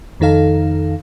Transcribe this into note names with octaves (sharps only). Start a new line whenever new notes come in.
F2 D#3 D#4 A4 F5